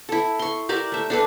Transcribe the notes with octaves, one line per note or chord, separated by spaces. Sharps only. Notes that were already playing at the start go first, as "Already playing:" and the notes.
E4 A4
C6 C#6
G4 A#4 D5 E5
A3 E5
D4 A4 B4